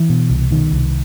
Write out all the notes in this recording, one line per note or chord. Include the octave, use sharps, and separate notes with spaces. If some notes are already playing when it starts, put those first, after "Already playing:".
Already playing: E3
B2
C2
B2 D#3
C2